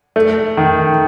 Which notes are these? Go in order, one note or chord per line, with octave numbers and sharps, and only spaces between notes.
A3
D#3